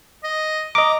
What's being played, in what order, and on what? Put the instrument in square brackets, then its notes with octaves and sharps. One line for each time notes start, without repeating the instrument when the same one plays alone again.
[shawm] D#5
[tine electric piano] D#5 D6 [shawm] A#5